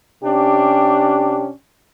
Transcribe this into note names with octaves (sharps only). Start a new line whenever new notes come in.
C3 C#4 D4 G4